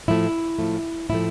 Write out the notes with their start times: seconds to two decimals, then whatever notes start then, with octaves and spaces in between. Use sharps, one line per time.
0.08 A2 F3 A3 E4
0.59 A2 F3 A3
1.10 A2 F3 A3 E4